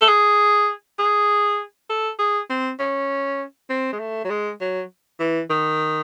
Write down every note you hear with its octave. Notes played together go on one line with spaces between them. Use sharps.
A4
G#4
G#4
A4
G#4
C4
C#4
C4
G#3
A3
F#3
G#3
F#3
E3
D#3